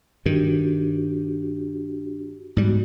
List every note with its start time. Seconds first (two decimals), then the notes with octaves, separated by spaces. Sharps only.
0.26 G2 D#3 D4 F#4 G4
2.57 G#2 G3 B3 F#4